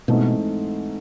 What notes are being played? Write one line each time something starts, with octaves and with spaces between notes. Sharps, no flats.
G#2 B2 E3 A3 C4 D#4